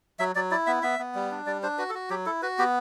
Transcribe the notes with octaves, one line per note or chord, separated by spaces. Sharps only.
F#3 E5
F#3 D5
E4 D5
B3 E5
B3 E5
B3
G3
D4
G3 D5
D4 C5
F#4 B4
A4
F#4
F#3 G4
E4 A4
F#4 B4
B3 G4